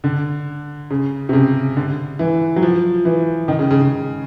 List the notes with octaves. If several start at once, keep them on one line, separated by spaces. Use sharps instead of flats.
D3
C#3
C3
C#3
D3
E3
F#3
F3
E3
D#3
C#3
C#3
C#3